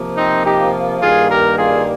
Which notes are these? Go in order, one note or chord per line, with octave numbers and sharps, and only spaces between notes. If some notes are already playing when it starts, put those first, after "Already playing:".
Already playing: C3 F3 A#3
C4 D#4
D#4 G4
G2 D#3 G3 A#3 F4 G#4
G4 A#4
F4 G#4